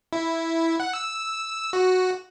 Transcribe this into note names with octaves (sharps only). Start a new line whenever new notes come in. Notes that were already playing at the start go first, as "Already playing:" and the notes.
E4
F#5
E6
F#4